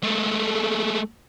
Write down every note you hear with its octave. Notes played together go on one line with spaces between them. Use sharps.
G#3 A3